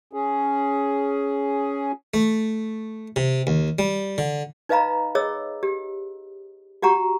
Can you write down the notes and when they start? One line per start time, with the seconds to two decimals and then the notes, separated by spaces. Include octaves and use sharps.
0.13 C#4 G#4
2.14 A3
3.16 C3
3.47 D#2
3.79 G3
4.18 D3
4.69 D#4 B4 D#5 F5 A#5 B5
5.15 G#4 C#5 D#5 E6
5.63 G4
6.82 F#4 G4 F#5 A#5 C#6